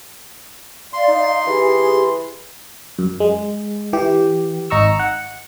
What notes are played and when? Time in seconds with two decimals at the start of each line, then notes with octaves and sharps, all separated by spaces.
0.93 D5 F5 C6
1.08 D#4
1.47 E3 G4 G#4
2.99 F#2
3.20 G#3
3.93 E3 G4
4.70 G#1 D#4 A#5 C#6 E6
4.99 F#5